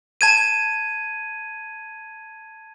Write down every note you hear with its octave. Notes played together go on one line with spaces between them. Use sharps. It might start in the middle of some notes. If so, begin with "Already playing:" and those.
A5 G#6 D#7